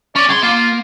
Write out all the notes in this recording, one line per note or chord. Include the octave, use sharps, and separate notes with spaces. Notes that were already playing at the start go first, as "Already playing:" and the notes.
C#4 D5
C2 G#4 C6
A#3 F4